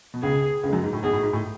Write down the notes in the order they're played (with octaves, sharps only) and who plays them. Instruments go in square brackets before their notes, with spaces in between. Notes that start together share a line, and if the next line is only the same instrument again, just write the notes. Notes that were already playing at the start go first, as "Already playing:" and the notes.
[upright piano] B2
[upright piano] C#2 C#3 [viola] G#4
[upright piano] C#2 C#3
G#3
F#2 F#3
G#2
A2
[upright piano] B1 B2 [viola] G#4
[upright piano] A2
G#2
A2